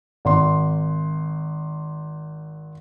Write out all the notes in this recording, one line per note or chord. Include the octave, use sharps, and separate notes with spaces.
G#1 C6